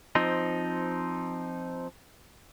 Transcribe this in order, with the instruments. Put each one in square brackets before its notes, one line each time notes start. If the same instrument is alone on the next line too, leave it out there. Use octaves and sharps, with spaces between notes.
[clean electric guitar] F3 C4 D#4